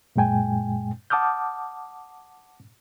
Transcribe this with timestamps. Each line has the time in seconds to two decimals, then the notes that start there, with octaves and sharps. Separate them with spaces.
0.16 F#2 A#2 G#3 G5 G#5
1.10 F#5 A5 D6 D#6 F6 G6